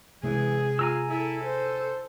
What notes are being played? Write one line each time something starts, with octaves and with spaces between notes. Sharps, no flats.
C3 E3 G#3 G#4
F4 G#5 A#5 E6
E4 A4
C5